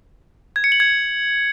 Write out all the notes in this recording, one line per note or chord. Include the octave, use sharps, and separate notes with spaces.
G#6
C#7
F#7
G#6